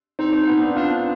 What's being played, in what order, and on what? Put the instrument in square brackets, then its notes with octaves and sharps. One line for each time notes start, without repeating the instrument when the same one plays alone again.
[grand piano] C4 [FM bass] D#4
[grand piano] C4
B3
D4
[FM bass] D4 [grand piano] F4